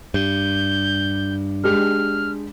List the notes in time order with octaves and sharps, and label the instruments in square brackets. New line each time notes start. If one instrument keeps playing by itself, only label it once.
[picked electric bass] G2 [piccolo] G6
[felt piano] G#3 D4 G4 [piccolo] F6